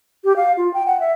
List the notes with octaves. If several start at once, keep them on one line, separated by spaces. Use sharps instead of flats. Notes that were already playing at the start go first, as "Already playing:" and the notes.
G4
F5
F4
G5
F#5
E5